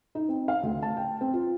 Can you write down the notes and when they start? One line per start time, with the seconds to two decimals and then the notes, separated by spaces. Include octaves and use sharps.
0.15 D#4
0.29 C4
0.48 F5
0.63 D2
0.82 A5
0.97 G5
1.21 C4
1.33 F4